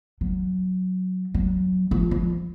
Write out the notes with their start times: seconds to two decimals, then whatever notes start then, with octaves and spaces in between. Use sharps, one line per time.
0.21 F#3
1.34 F#3
1.91 F3
2.11 F3